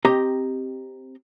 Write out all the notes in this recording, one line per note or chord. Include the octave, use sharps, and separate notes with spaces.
C4 G4 D#5 A#5